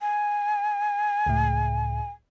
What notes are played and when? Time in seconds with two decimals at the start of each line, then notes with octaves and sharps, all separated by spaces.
0.01 G#5
1.26 C#2 A2